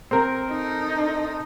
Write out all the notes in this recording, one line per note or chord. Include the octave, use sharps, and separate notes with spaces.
C4 A#4
D#4 A4